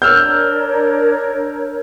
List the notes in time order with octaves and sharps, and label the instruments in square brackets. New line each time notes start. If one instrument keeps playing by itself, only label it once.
[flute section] D4 A#4 C#5 [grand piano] E6 F6 G6